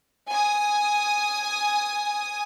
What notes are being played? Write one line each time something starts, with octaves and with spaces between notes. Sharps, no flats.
G#5 D#6